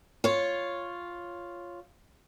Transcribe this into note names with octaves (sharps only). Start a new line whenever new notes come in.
F4 C#5